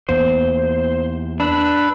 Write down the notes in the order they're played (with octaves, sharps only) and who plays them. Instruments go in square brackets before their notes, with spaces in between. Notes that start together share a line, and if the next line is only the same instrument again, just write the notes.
[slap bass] E2 A#3 B3 [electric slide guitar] C5
[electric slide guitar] D4 [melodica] B4 B5 E6